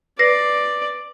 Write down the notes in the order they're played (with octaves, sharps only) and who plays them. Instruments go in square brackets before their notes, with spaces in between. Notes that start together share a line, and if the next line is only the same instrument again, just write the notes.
[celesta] B4 A#6 C7 [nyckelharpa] D5